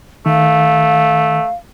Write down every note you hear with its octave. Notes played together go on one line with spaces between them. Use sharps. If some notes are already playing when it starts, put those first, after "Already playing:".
D#3 A3 F5